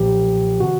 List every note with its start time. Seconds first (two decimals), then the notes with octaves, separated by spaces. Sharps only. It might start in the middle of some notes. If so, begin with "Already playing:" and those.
Already playing: B1 A#2 F3 G4
0.60 C3 D#3 F#4